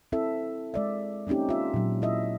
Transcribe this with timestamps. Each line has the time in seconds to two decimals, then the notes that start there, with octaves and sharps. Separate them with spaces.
0.12 C4 E4 A4 E5
0.74 G#3 D5 E5
1.27 A#3 C4 C#4 D#4 G4
1.49 F4 E5
1.74 A#2 F#3
2.02 E4 D#5 E5